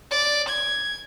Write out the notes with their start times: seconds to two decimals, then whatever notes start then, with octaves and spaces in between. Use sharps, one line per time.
0.11 D5
0.49 G#6